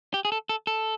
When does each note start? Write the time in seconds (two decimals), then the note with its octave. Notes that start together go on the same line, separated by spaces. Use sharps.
0.14 G4
0.25 G#4
0.32 A4
0.49 A4
0.67 A4